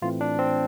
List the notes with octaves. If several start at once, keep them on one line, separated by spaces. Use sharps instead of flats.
A2 E3 A3 C4 F4
D4
C4